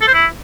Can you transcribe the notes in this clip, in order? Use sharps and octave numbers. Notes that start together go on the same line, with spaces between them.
A4
C5
E4